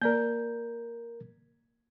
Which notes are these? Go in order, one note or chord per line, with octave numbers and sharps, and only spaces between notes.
A#3 A#4 D5 G6